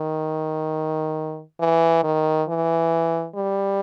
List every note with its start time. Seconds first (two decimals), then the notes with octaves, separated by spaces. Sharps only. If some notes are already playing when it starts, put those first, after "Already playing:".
Already playing: D#3
1.60 E3
2.04 D#3
2.48 E3
3.35 G3